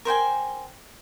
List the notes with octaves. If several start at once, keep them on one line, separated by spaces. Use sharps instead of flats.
A#4 C5 G5 G#5